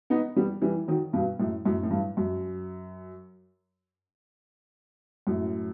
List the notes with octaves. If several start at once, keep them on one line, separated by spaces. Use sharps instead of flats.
B3 D#4
G3 B3
E3 G3
D#3 F#3
G2 B2
F#2 A2
F#2 A2
A2
G2
F#2
F#2 A2